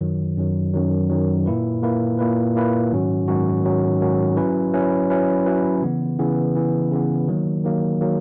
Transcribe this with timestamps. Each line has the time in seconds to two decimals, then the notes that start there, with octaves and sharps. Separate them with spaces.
0.01 F#2 D#3 F#3
0.37 F#2 D#3 F#3
0.73 F#2 D#3 F#3
1.10 F#2 D#3 F#3
1.46 A#2 A#3 E4 B4
1.83 A#2 A#3 E4 B4
2.19 A#2 A#3 E4 B4
2.55 A#2 A#3 E4 B4
2.92 G#2 D#3 F#3 C#4 F#4
3.28 G#2 D#3 F#3 C#4 F#4
3.64 G#2 D#3 F#3 C#4 F#4
4.01 G#2 D#3 F#3 C#4 F#4
4.37 F#3 C#4 E4 B4
4.74 F#3 C#4 E4 B4
5.10 F#3 C#4 E4 B4
5.46 F#3 C#4 E4 B4
5.83 C#3 E3 B3
6.19 C#3 E3 B3
6.55 C#3 E3 B3
6.92 C#3 E3 B3
7.28 D#3 F#3 A#3
7.65 D#3 F#3 A#3
8.01 D#3 F#3 A#3